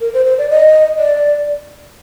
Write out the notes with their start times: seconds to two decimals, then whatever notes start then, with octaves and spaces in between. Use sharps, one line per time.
0.01 A#4
0.14 C5
0.26 C5
0.38 D5
0.50 D#5
0.99 D5